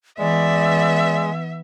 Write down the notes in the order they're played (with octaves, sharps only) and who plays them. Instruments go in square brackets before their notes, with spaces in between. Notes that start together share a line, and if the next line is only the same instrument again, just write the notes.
[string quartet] E3 B3 [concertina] G#3 [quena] D5 [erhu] E5